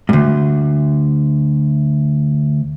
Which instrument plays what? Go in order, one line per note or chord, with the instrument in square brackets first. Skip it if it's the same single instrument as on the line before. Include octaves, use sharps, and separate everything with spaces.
[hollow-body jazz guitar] D2 G2